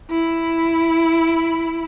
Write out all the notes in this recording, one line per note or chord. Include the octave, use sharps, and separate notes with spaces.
E4